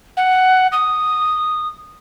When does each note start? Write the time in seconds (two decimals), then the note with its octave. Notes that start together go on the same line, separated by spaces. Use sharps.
0.17 F#5
0.72 D#6